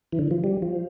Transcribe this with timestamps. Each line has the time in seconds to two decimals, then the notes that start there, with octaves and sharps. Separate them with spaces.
0.12 E3
0.19 D3
0.31 F3
0.44 G3
0.62 F3